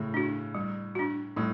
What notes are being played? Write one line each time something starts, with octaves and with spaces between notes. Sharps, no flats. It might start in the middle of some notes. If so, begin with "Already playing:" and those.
Already playing: A2 C#3
D4 F#4
G3
D4 F#4
A2 G3